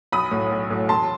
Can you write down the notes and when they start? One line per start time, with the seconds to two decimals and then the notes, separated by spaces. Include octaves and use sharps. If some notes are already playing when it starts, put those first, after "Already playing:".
0.12 B1 B5 D#6
0.31 A2 F#3
0.51 B1
0.70 A2 F#3
0.89 E1 A5 C6